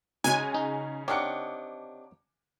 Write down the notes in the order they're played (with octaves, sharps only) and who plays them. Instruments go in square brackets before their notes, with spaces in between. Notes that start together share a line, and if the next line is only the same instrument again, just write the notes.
[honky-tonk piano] C#3 C#4 [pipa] G#3 F#4 [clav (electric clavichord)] D#4 [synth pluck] G#5
[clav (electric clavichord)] D#4 G#4
[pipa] C3 D4 D#4 [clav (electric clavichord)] C#5 F5 F#5 [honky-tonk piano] D6 C#7